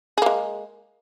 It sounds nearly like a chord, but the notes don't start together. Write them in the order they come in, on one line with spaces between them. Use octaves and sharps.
G#4 A#3 G#3